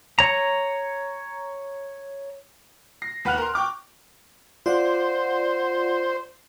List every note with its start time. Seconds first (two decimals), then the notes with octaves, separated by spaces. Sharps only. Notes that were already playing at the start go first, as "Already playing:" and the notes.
0.19 C#5 A#5
3.02 A#6 C7
3.25 D#2 B4 F#5 F6 F#6 F7
3.38 A#4 C6
3.54 G5 C#6 D6 F6
4.66 F4 C5 D5 F#5